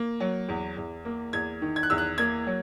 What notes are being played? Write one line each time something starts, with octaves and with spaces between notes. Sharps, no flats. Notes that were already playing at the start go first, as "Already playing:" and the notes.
Already playing: A#3
F#3
E2
E2
A#3
E2 G#6
D#3
G#6
F#6
E2 E6
F#6
A#3 G#6
F#3